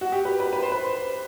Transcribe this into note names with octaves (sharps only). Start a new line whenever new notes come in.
F#4
G4
B4
B4
B4
C5
B4